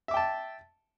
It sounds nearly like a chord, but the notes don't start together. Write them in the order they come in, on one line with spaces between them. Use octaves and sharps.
E5 D6 G5 A5